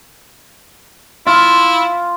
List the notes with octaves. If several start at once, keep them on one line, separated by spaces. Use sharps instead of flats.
E4 F4